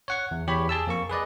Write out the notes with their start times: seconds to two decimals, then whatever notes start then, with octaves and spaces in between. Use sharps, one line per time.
0.08 C#5 F#5 C#6
0.31 E2
0.47 E2 G4 C#5 B5
0.69 G#4 A5 E6
0.87 F2 A#3 C#6
1.10 G#4 B4 D5 D#5